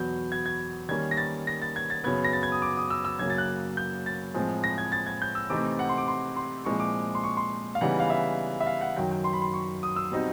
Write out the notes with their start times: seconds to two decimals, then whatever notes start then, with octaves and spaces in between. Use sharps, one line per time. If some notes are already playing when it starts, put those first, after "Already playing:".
Already playing: E2 B2 F#3 B3 G6
0.32 G#6
0.46 G#6
0.89 D#3 G3 A#3 C#4 G#6
1.11 A#6
1.17 A6
1.47 A#6
1.62 A6
1.76 G#6
1.90 A6
2.04 F#2 C#3 F#3 B3 G#6
2.24 A#6
2.33 A6
2.43 G#6
2.52 D#6
2.62 D6
2.77 D#6
2.90 E6
3.05 E6
3.19 F#2 C#3 F#3 A#3 G#6
3.30 A6
3.38 F#6
3.77 G6
4.06 A6
4.34 A2 F3 G#3 C4
4.64 A#6
4.78 G#6
4.92 A6
5.07 G#6
5.22 G6
5.35 E6
5.50 C3 E3 A3 C4 D#4 D6
5.79 F#5
5.89 C6
5.98 D6
6.08 C6
6.36 C6
6.65 A#2 F3 G#3 C4 E4 C#6
6.80 D6
7.15 C6
7.24 C#6
7.37 C6
7.75 F5
7.81 C#3 E3 G3 B3 D#4 F#5
8.00 F5
8.10 E5
8.61 E5
8.67 F5
8.81 F#5
8.96 F#2 D#3 F#3 G5
9.11 G5
9.24 C6
9.33 B5
9.42 C6
9.53 C#6
9.83 D#6
9.96 E6
10.11 B2 G3 C4 D#4